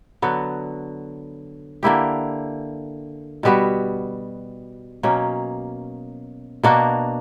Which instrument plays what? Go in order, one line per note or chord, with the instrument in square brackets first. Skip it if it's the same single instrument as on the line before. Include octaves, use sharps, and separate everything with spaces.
[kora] D3 F#3 B3 F#4
D3 A#3 E4 G4
B2 G3 B3 F#4
B2 F#3 A#3 C#4
B2 A#3 D4 F#4